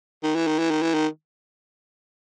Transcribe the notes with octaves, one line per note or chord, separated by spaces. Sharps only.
D#3
E3
D#3
E3
D#3
E3
D#3